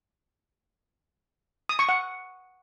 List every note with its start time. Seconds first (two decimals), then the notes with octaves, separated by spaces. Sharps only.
1.69 D#6
1.79 C#6
1.89 F#5